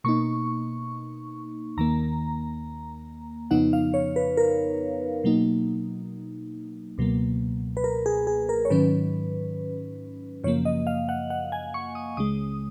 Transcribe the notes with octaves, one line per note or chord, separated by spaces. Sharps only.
B2 A#3 D#4 C#6
D#2 D#3 A#3 A#5
F2 C#3 F3 B3 D#4 F#5
F5
C#5
B4
A#4
B2 F#3 A#3 D#4
C#2 B2 F#3 A#3
B4
A#4
G#4
G#4
A#4
C#5
G#2 D#3 F#3 C#4 B4
F#2 C#3 F3 A#3 C#5
D#5
F5
F#5
F#5
G#5
C#6
D#6
C#2 C#3 G#3 D#6